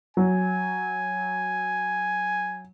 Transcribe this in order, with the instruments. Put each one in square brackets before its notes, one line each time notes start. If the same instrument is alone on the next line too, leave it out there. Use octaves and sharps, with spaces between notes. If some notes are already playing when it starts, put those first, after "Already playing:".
[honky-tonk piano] F#3 [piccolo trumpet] G#5